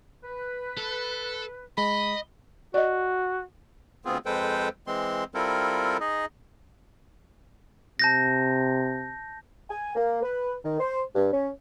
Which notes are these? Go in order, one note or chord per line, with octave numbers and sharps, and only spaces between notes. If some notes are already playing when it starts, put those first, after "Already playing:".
B4
A4
G#3 D#5 B5
F#4 D5 D#5
D2 B3 C4 F4 G#4
F2 G#3 A4 B4 C5 G5
E3 G#3 C4 C6
G3 C4 E4 F4 A4 A#4
D#4 G#4 D#5
C3 A5 G6 A#6
G#5
A#3
B4
D#3
C5
G2
C#4